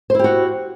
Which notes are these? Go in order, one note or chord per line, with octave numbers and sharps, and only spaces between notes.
E4 F#4 G4 C5